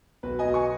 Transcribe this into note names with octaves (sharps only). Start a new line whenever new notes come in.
B1 F#4 B4
D#5 G#5
B1
G#5 C#6